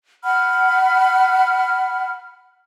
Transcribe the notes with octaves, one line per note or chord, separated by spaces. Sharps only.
F#5 B5 F6